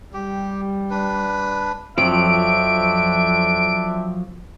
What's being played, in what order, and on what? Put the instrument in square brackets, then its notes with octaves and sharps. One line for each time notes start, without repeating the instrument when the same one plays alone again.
[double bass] G3 [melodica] G4
[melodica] D4 B4
[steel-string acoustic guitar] F2 [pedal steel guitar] F3 F#3 [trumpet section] C4 D4 E5 [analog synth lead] D7